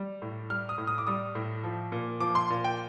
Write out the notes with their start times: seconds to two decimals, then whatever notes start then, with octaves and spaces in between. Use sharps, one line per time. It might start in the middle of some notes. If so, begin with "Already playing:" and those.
Already playing: G3
0.22 A2
0.50 G3 F6
0.69 D#6
0.78 A2
0.87 D#6
0.98 D6
1.07 G3 D#6
1.35 A2
1.63 F3
1.92 A#2
2.20 F3 D6
2.35 C6
2.50 A#2
2.64 G5